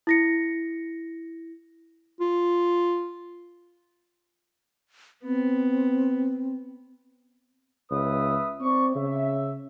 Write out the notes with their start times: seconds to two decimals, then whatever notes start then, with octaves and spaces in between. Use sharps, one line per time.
0.07 E4 A#6 C#7
2.21 F4
5.24 B3 C4
7.90 C#2 B4 E5 D#6
8.61 C4 D5 C#6
8.95 C#3 E5